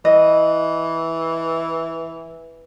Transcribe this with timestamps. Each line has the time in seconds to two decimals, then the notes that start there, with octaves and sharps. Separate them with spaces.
0.05 E3 D#5